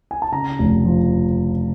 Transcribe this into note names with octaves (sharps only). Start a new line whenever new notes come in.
G#5
A5
C#3 A#5
F1
F3